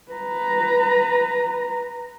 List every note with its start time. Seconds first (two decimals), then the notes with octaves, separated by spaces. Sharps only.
0.11 B4 A#5